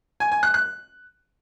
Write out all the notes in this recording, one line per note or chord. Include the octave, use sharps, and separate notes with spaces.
G#5
G#5
F#6
F#6